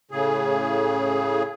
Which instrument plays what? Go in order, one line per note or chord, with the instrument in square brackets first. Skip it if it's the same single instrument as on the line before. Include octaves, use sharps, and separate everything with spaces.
[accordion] A2 C#3 G#4